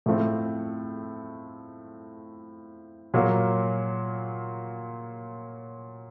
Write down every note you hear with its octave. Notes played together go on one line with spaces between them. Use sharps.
A2 F3 A3 C4
A#2 F#3 A#3